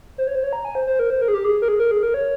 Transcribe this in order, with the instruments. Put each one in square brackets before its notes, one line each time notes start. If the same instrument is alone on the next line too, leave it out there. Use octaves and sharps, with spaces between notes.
[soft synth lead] C5
C#5
C5
C#5
A#5
G#5
C5
C5
A#4
C5
A#4
G#4
G4
G#4
A#4
G#4
A#4
G#4
A#4
C#5